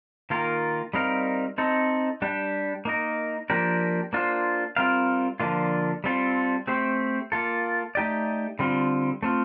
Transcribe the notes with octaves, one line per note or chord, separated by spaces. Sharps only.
D#3 A#3 F4 A#4
G3 C4 D#4 A#4 F5
C4 D#4 A4
G3 D4 G4
A#3 D#4 A#4
F3 A#3 D4 G4 A#4
A#3 D4 F4 C5
G3 C4 F4 A#4 F5
D3 F3 A#3 D4 F4
G3 C4 F4 A4
A3 C4 G4 C5
A#3 F4 A4
A3 D#4 G4 D5
D3 G3 C4 F4
A3 C4 F4